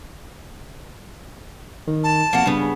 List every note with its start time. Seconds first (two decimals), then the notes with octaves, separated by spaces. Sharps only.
1.87 D#3
2.04 A5
2.33 F2 A#3 F#4
2.46 G2 C#3 B3